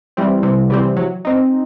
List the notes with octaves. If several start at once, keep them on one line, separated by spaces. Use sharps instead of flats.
E3 G3 C4
C3
E3 G3 C4
F#3
C4 D#4